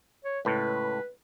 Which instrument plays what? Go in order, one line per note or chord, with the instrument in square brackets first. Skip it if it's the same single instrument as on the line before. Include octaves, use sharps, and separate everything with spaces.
[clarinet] C#5
[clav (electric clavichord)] C#2 A2 [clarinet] B4